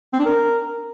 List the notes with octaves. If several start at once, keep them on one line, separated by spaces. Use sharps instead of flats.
C4
D4
A#4